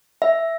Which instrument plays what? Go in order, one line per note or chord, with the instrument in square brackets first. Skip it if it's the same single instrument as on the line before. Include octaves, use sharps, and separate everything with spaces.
[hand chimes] E5